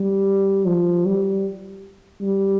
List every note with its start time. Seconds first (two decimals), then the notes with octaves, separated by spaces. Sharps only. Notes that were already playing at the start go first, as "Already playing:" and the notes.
Already playing: G3
0.67 F3
1.06 G3
2.22 G3